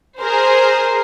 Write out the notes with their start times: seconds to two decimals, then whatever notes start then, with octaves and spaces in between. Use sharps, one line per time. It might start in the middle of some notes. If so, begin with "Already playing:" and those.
0.21 G#4 A#4 C5